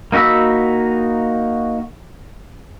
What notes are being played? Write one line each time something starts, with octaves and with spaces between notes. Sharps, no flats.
A#3 D#4 F#4 B5 E6